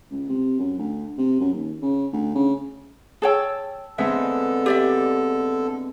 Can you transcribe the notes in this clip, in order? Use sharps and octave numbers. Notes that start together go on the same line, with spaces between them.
C#2
C3
F#2
D2
C3
F#2
D#2
C#3
D2
C#3
G#4 C#5 G5 A5 E6
D3 G#3 B3 C4 A4 E5
G4 D5 E5